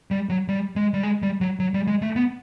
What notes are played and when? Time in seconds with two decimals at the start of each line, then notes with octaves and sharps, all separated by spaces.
0.11 G3
0.29 F#3
0.48 G3
0.76 G#3
0.94 G3
1.03 G#3
1.23 G3
1.41 F#3
1.60 F#3
1.74 G3
1.87 G#3
2.02 A3
2.16 B3